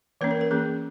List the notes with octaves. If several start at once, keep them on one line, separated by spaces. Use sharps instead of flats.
E3 A#3 C#4 B4
A#4
A#4
E3 A#3 C#4 G#4